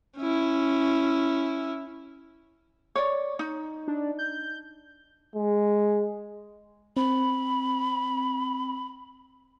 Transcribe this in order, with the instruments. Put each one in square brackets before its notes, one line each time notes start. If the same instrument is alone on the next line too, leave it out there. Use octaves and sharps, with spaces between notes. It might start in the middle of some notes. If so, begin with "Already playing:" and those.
[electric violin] C#4 E4
[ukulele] C#5 D5
D#4
[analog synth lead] D4
G6
[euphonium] G#3
[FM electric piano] C4 [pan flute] B5